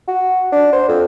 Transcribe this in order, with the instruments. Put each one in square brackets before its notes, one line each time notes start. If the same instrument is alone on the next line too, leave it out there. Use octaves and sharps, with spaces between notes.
[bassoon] F#4
D4
C5
F2